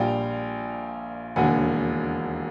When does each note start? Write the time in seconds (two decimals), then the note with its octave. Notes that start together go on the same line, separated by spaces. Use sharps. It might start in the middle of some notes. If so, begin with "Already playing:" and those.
Already playing: A#1 A#2 G3 F5 G5
1.36 E1 D#2 D3 F#5 G#5